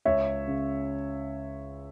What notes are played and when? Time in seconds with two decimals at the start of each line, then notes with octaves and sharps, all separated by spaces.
0.05 C#2 C#5 E5
0.48 C#3